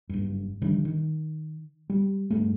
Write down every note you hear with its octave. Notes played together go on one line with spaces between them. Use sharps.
F#1 G2
D3 D#3 F3 G3
D#3
G3
G2 G#3 A3